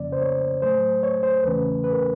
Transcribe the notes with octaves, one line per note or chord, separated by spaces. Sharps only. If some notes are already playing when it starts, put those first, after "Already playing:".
Already playing: F2 C#3 F3 A#3 C#4 D5
C5
C#5
A2 F#3 A3 C5
C#5
C5
E2 C#3 E3 A3 C#4 B4
B4
A#4